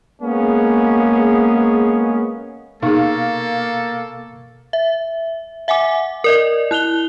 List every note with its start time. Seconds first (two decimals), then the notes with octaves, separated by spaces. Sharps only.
0.22 G#3 A#3 B3 C#4 G#4
2.83 B2 A#3 D#4 G#4 A4 F5 C#6
4.73 E5
5.68 E5 F#5 G#5 D6
6.24 A#4 D5 D#5
6.71 E4 F#6 F7 G7